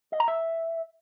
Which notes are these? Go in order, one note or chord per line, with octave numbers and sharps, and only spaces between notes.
D#5
A#5
E5